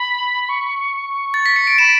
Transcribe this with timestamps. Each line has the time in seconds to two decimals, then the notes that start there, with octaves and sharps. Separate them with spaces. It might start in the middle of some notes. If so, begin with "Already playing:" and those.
Already playing: B5
0.49 C#6
1.34 A6
1.46 B6
1.56 C#7
1.67 D7
1.78 B5 E7